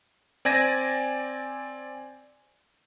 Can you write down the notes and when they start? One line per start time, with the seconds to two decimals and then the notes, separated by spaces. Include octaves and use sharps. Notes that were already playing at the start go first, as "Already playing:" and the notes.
0.45 C4 D5 G#5 G#6 A#6 D#7